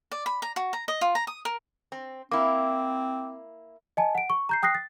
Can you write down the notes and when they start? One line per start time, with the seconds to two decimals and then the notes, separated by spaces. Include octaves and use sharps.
0.12 D5
0.26 B5
0.42 A#5
0.56 F#4
0.73 A#5
0.88 D#5
1.01 F4
1.15 A#5
1.27 D#6
1.45 A#4
1.92 C4
2.31 A#3 C4 E4 D6
3.97 D#5 G#5 A5
4.15 F#5 D7
4.30 C#6
4.49 A#5 G6 C7
4.63 G5 D#6 F#6 A#6 C7
4.75 A6